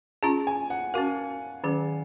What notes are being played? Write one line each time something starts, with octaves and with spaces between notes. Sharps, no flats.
C#4 F4 G#4 A#5
G#5
F#5
C#4 F#4 A#4 F5
D#3 F#3 C#4 G#4